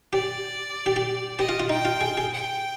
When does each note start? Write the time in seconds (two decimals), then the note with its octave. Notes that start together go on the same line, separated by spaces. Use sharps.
0.13 G4 D5
0.86 G4
0.96 G4
1.38 G4 D#5
1.49 F4
1.60 F4
1.70 D#4 G5
1.85 F4
2.01 G#4
2.17 G#4
2.33 G5